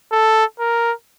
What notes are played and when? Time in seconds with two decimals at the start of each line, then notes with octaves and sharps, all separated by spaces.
0.12 A4
0.59 A#4